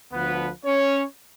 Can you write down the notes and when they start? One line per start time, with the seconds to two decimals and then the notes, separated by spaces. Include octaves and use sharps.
0.11 D2 D3 F3 B3 B4
0.64 C#4 C#5